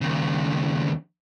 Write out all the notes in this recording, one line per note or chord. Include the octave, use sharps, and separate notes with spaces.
D#2 C#3